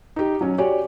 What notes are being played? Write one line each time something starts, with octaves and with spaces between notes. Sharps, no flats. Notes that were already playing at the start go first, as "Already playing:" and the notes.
D#4 G4
F#3 C#4
F#4 G4 C#5 D5 G#5